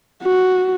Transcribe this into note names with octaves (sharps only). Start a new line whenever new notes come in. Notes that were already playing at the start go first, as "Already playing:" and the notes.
F#4